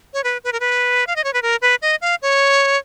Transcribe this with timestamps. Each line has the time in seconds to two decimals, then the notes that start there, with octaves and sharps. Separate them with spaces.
0.14 C#5
0.24 B4
0.44 B4
0.53 A#4
0.60 B4
1.07 F5
1.16 D#5
1.24 C#5
1.33 B4
1.42 A#4
1.62 B4
1.82 D#5
2.01 F5
2.22 C#5